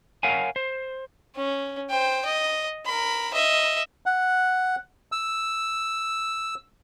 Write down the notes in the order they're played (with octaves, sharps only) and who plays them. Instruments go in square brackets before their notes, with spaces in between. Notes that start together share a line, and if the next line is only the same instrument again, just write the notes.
[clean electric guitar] A#4 C#5 F5 F#5 G#5
C5
[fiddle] C#4
C5 G5
D#5
A#4 B5
D#5 E5
[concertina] F#5
E6